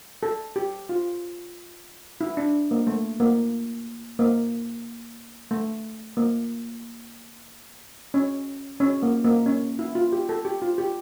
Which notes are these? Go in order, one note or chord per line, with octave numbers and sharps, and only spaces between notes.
A4
G4
F4
E4
D4
A#3
A3
A#3
A#3
A3
A#3
C#4
C#4
A#3
A#3
C#4
E4
F4
G4
A4
G4
F4
G4